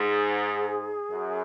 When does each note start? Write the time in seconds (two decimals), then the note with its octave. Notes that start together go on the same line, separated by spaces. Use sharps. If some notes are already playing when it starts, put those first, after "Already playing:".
Already playing: G#2 G#4
1.10 F#2